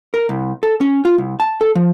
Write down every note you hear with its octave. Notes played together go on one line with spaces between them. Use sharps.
A#4
C2
A4
C#4
F4
C2
A5
A4
F3